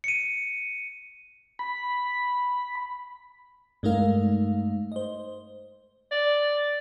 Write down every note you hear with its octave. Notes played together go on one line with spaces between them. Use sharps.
C#7 D#7
B5
G2 G#3 A3 D#4 A#4 F5
C5 D#5
D5